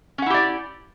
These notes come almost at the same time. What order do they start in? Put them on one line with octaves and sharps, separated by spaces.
C#4 F#5 E4 G4 D5